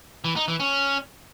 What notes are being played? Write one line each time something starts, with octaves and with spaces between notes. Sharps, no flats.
E3
D#4
E3
C#4